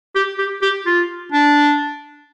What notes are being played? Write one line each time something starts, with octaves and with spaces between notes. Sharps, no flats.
G4
G4
G4
F4
D4